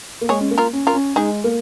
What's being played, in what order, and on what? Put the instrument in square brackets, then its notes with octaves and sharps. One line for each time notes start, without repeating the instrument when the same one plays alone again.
[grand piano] A#3
[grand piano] G#3 [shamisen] G#4 C#5
[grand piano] C#4
A#3
[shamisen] F4 A#4
[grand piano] C#4
[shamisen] F4 A#4
[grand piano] C#4
[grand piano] G#3 [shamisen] D#4 G#4
[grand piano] A#3